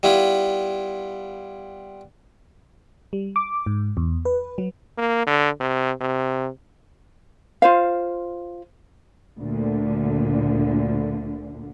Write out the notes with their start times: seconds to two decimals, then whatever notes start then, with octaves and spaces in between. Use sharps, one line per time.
0.03 G3 B3 E4 F4
3.13 G3
3.36 D6
3.66 G#2
3.97 E2
4.25 B4
4.58 F#3
4.98 A#3
5.27 D3
5.60 C3
6.01 C3
7.62 F4 C5 F5
9.39 D2 A#2 D3